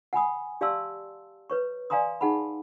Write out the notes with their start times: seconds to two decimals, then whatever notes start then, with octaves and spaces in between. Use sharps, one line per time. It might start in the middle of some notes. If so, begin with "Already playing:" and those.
0.13 F#5 G#5 B5 D#6
0.61 G4 D5 F5 A5 C6 E6
1.50 B4 C#5 C#6
1.90 D5 F5 G#5 A#5 C6 D#6
2.21 D#4 G#4 F#5 A5 B5